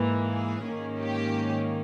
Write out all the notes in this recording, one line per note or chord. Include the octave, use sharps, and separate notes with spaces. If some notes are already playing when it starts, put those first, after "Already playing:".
Already playing: G#2 E3 A#3
G#4
G#2 D#3 A#3 C#4
G4